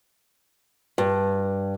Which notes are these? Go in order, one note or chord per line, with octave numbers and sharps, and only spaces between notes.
G2